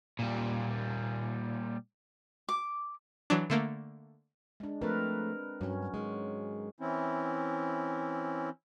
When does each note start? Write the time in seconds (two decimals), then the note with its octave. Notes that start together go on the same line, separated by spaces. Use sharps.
0.19 A#2 G3
2.49 D6
3.30 E3 F#3 D4
3.50 D3 A3 A#3
4.60 G#3 D4
4.81 F3 A3 C4 A#4 B4
5.61 G2 F#3 C#4
5.94 G#2 D#3 G#3
6.80 E3 C4 C#4 E4